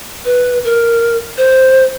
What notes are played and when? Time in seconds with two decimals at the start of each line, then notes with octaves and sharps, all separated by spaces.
0.25 B4
0.64 A#4
1.38 C5